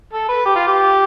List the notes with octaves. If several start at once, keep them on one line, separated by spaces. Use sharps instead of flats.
A4
B4
G4
F4
G4